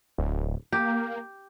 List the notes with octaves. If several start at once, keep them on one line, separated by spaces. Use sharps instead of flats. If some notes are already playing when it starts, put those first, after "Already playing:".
D1
A#3 G4